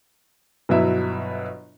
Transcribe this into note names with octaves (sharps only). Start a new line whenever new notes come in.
G1 B2 F#3 E4 E5